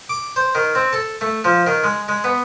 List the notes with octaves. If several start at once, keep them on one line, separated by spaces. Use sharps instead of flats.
D6
C5
D#3
C4
A4
A3
F3
D#3
G#3
G#3
B3